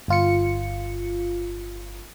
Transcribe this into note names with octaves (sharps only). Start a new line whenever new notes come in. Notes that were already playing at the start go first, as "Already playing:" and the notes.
G1 F4 C#7